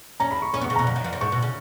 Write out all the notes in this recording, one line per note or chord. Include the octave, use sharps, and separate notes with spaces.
C#4 A#5
B5
C#6
C#4 C#6
B3
C#6
C#3
B2 A#5
F2
F#2
F2
F#2
G#2 C#6
B2
C#3